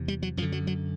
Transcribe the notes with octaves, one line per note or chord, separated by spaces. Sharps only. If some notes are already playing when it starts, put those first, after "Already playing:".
Already playing: E2 C3
G3
F#3
F#2 D3 F3
F#3
F#3